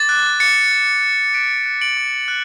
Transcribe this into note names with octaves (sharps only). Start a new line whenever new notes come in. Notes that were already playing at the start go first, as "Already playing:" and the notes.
Already playing: D6 A6
F#6
D6 A6 C#7
F#6
F#6
F#6 B6 D7
F#6
D7 F#7
D6
F#6